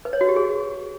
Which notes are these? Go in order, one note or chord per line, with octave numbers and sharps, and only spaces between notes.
B4
C#5
F#4
G4
G#4